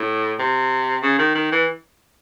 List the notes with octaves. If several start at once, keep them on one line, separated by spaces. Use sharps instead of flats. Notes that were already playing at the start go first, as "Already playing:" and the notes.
Already playing: A2
C3
C#3
D#3
D#3
E3